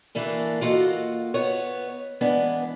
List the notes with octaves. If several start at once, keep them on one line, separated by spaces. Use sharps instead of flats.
E3 A3 A#3 D4
A#3 F4 F#4 A4 D#5
B3 C#5
E3 G#3 B3 C#4 D4